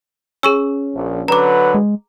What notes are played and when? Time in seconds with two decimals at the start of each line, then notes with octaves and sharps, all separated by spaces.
0.43 C#4 G#4 C#6 E6
0.93 A#1
1.28 D3 F#3 B4 A#5 D6
1.75 G#3